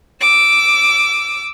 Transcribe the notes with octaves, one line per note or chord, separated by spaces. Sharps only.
D6 E6